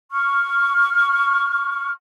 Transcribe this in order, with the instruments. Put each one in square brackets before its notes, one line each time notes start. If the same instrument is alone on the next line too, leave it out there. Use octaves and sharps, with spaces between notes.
[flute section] C#6 F6